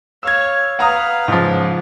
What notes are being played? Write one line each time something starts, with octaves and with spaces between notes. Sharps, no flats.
C#5 F5 E6 G#6
B4 F5 F#5 A#5 D#6
G#2 C#3 F3